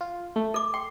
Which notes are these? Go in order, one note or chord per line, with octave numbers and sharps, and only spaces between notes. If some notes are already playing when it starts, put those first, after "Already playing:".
F4
A3
A4 D6
G5 C6